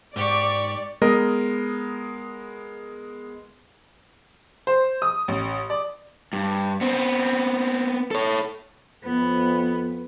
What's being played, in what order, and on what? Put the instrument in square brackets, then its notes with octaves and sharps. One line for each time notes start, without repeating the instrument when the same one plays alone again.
[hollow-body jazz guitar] G#2 [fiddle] G4 C#6 [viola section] D5
[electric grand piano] G#3 B3 A#4 D#5
[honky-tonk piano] C5
D#6
A1
D5
[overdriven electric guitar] G2
B3 C4
A4 C#5
[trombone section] F2 B4 [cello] B3